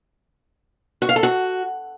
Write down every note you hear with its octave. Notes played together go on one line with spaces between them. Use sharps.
F#4
F5
A4
F#4